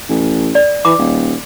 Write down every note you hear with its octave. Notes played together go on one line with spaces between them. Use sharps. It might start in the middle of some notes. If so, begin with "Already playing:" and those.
A1
D5
E3 D6
D#1